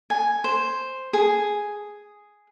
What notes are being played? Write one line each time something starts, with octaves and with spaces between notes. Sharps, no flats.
G#5
C5
G#4